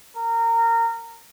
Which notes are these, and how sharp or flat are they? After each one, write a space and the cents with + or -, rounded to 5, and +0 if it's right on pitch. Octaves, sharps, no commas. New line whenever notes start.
A#4 -20